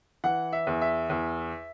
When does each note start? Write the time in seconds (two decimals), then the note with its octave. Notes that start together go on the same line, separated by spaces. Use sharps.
0.24 E3 F#5
0.53 E5
0.67 E2
0.81 E5
1.10 E2